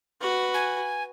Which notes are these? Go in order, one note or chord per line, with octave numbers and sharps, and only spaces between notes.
F#4 B4
G#5